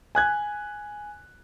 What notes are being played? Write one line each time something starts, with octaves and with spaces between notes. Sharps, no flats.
G#5 F#6 G#6